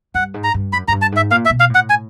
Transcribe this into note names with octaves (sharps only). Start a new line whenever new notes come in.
G2 F#5
G#2
A#5
G2
F#2 B5
F#2 A#5
G2
A5
G#2 E5
A#2 F5
E5
B2
F5
A2
F#5
G#5